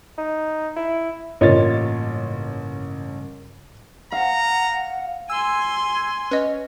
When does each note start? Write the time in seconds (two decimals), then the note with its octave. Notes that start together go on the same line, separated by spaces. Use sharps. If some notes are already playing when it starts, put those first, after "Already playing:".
0.18 D#4
0.76 E4
1.41 A1 G2 C#3 A#3 F4 C#5 D#5 A6
4.12 F5 F#5 A#5
5.30 G#5 C6 E6
6.31 C#4 B4 D#5